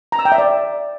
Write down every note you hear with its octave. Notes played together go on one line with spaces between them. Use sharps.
A#5
E6
G5
E5
D5